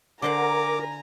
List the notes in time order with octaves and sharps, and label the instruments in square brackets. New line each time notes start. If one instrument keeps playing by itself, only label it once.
[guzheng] D3 C5 F#5 [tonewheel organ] A#4 [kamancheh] G#5 A#5 [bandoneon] D6